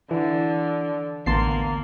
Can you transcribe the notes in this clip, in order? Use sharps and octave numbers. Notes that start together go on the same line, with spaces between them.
D3 E3
A1 D2 A#3 B3 A5 C6 C7